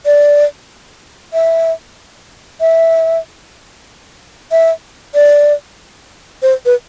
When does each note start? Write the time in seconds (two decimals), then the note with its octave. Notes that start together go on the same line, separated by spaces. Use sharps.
0.06 D5
1.33 E5
2.61 E5
4.52 E5
5.15 D5
6.43 C5
6.66 B4